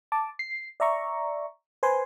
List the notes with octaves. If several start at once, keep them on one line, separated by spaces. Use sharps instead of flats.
A5 D6
C7
D5 E5 A#5 C#6
B4 C5 G#5 C6